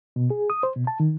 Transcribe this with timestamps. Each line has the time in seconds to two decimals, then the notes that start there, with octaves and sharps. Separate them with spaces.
0.16 B2
0.30 G#4
0.50 D#6
0.63 C5
0.76 B2
0.87 A5
1.00 D#3